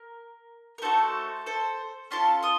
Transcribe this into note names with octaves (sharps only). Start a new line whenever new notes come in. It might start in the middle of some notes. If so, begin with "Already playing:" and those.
Already playing: A#4
A#4
A3 D#4 F#4 A4 C5
A4 C5
C#4 F4 A4 A5 C6
C6 D#6